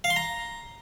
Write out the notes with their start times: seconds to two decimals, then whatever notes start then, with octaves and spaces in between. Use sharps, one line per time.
0.04 F5
0.10 C6
0.16 A#5